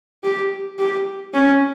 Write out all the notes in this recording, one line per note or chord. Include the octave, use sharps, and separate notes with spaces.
G4
G4
C#4